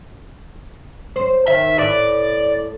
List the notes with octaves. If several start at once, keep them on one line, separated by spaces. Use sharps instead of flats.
C5
D#3 E5
A2 B4 D5 E5